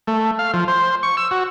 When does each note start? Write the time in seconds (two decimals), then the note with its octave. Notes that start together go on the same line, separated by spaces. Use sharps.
0.07 A3
0.39 F5
0.54 F3
0.68 C5
1.03 C#6
1.17 E6
1.31 F#4